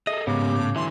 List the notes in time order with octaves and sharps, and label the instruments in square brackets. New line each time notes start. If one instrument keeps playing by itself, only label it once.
[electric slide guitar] G#4 A4 [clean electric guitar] D#5 [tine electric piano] E5
[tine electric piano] G#2 B3 [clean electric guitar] C#3 [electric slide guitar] G#3 A#3 G4 [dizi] D6
[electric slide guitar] A2
[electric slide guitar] D3 F#3 [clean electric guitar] E3 [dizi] C6